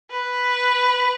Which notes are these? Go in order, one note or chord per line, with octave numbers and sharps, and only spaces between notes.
B4